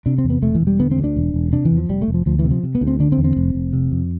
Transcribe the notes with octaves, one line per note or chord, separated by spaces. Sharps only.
C3 D4
C4
E2
B3
E1 A3
E3
E1
G3
D3 B3
C4
D2
D4
E1
E1
C3 D4
E3
E2
F3
F1 G3
A3
F1
F3
D2 F3
E3
C3
F3
C3
B3
D2
C4
D3 D4
C4
E2
C4
F1
F1
C3
F2